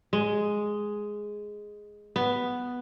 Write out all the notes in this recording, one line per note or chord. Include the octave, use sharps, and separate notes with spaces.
G#3
B3